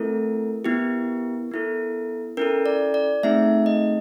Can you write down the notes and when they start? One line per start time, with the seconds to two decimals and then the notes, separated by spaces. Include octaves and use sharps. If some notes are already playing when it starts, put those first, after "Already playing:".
Already playing: A3 C4 E4 A4 A#4
0.64 B3 E4 G4
1.51 B3 E4 A4
2.37 C#4 E4 A4 A#4
2.66 D5
2.94 D5
3.23 A3 C4 D#4 G#4 E5
3.66 D#5